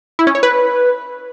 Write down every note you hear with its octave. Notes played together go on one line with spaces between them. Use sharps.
E4
C#4
C#5
B4